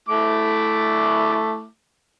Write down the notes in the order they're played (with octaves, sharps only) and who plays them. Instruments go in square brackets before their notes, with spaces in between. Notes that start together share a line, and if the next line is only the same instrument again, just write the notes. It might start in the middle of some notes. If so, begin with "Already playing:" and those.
[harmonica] A3 E4 D6